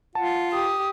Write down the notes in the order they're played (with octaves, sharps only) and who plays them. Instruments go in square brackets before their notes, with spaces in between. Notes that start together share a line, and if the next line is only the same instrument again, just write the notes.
[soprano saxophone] F4 [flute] F#5 [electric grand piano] A5
[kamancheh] G4 [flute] D#6